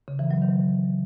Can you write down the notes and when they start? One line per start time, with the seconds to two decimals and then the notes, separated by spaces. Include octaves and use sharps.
0.08 C#3
0.19 E3
0.31 F#3
0.42 D#3